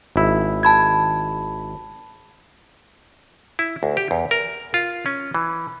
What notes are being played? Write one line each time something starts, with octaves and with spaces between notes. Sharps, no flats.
G#1 E4
A5 B5 G#6
E4
D2
G4
E2
A#4
F4
C#4
E3